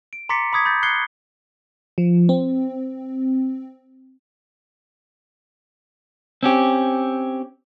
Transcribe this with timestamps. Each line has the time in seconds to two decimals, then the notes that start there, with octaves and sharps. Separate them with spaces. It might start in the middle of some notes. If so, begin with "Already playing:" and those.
0.13 D7
0.29 A#5 C6 D6 A6 B6 C#7
0.53 B5 D6 D#6 G#6 B6
0.65 B5 G6 A6
0.83 F#6 G#6 C7 C#7 G7
1.98 F3
2.29 C4
6.43 C4 C#4 G4